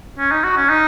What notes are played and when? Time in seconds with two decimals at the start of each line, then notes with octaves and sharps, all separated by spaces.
0.18 C#4
0.31 D#4
0.44 F#4
0.57 C#4
0.69 D#4